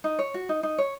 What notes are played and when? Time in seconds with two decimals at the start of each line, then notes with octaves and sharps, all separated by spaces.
0.04 D#4
0.19 C#5
0.34 F#4
0.49 D#4
0.63 D#4
0.78 C#5